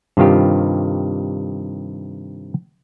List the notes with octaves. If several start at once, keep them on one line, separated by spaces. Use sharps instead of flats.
G2 C3 D#3 F4 G4